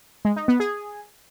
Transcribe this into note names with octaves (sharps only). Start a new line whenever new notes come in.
G#3
D#4
B3
G#4